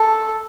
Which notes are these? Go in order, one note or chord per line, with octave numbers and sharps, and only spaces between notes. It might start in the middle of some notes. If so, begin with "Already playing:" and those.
Already playing: A4